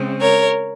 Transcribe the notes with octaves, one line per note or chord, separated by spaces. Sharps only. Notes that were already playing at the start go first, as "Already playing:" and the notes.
Already playing: C#3 G#3 C4
A#4 C#5